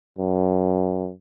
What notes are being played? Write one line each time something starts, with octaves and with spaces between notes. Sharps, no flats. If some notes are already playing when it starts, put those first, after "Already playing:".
F#2